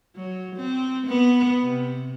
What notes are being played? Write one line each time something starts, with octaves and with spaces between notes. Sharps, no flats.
F#3
C4
B3
C3